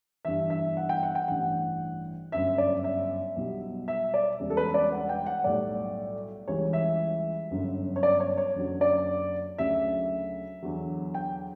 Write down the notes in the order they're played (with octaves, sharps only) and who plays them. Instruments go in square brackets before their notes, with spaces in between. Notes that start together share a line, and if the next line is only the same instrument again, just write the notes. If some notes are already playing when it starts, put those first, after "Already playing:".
[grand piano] G1 G2 E3 E5
E5
F#5
G5
F#5
G5
A1 G2 E3 F#5
G1 F#2 D3 E5
D5
E5
B1 B2 G3
E5
D5
E1 E2 C#3 G3
A4
B4
D5
F#5
G5
F#5
B1 A2 G3 D5
C#2 C#3 E3 G3 C#5
E5
G1 F#2 D3 F#3
C#5
D5
C#5
C#5
F#1 F#2 D3 F#3
D5
D2 C#3 F#3 E5
E2 D3 F#3
G5